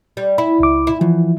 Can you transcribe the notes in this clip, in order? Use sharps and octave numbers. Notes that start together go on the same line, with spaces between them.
G3
E4 B5
C#2 D6
E4
E2 E3 F3